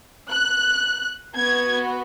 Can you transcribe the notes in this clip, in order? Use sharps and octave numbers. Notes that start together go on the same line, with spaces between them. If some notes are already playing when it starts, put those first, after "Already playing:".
F#6
B3 F#4 G#6